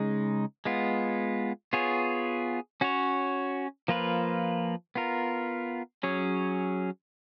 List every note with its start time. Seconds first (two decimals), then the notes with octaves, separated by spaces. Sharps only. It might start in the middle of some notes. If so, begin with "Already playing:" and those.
Already playing: C#3 G#3 D#4
0.65 G#3 B3 F4
1.73 B3 F4 G#4 C#5
2.81 C#4 F#4 C#5
3.88 F3 A#3 F4 B4
4.95 B3 F4 A#4
6.03 F#3 C#4 G#4 C#5